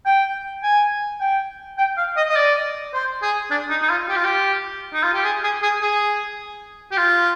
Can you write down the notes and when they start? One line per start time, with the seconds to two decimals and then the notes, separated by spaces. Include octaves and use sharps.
0.06 G5
0.63 G#5
1.20 G5
1.78 G5
1.97 F5
2.17 D#5
2.29 D#5
2.36 D5
2.94 C5
3.22 G#4
3.51 D4
3.70 D#4
3.82 D#4
3.90 F4
4.09 G4
4.16 F4
4.24 G4
4.93 D#4
5.03 F4
5.13 G4
5.24 G#4
5.43 G#4
5.62 G#4
5.81 G#4
6.92 G4
6.97 F4